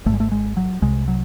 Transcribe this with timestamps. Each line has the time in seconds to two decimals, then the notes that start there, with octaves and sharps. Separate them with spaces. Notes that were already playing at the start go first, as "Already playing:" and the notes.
0.06 G#1 A3
0.09 G#2 G#3
0.20 A3
0.32 G#3
0.57 F#3
0.82 C2 C3 G#3
1.08 F#3